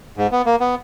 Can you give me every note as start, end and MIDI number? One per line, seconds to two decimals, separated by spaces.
0.17 0.27 44
0.32 0.42 59
0.46 0.56 58
0.60 0.75 59